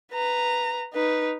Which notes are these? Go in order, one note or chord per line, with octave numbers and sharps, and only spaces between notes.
B4 A#5
D#4 B4